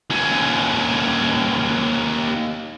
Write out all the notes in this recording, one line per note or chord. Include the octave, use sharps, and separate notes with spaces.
D#2 C#4